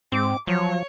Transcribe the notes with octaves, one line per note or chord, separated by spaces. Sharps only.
G#2 C4 D6
F3 F#3 C#5